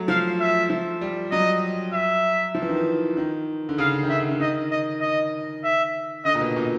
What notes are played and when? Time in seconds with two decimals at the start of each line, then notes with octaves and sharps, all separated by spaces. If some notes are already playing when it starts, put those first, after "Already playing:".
Already playing: F#3 A3
0.08 F3 F5
0.39 E5
0.70 F3
1.01 G3
1.32 F#3 D#5
1.93 E5
2.55 F3
2.62 E3
2.69 D#3
2.76 E3
3.17 D#3
3.69 D3
3.78 C#3 F5
4.03 D#3
4.09 D3 E5
4.31 D3
4.40 D#3 D#5
4.71 D#5
5.01 D#5
5.64 E5
6.25 D3 D#5
6.35 A#2
6.41 B2
6.56 A#2